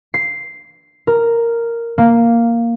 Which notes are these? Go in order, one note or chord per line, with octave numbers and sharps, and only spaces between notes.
C7
A#4
A#3